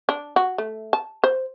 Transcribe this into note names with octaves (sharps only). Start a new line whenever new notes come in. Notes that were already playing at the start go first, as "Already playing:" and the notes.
D4
F#4
A3
A5
C5